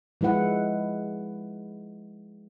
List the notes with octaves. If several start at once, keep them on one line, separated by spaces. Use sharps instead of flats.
F3 G#3 E4 B4 F#5